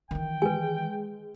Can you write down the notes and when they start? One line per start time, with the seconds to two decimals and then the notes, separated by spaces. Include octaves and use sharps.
0.11 D#3 E3 G5
0.42 G#3 B4 G#5